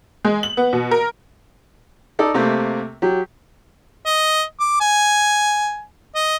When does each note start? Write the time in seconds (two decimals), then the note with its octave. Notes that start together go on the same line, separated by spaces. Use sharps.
0.25 G#3
0.43 F#7
0.57 B3
0.73 B2
0.91 A#4
2.19 D#4 A4 D5
2.34 C3 A3 A#3 C4
3.02 F#3 G4
4.06 D#5
4.60 D6
4.81 G#5
6.15 D#5